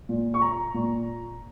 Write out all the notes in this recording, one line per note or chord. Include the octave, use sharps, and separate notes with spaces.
A#2
C#6
A#5
A#2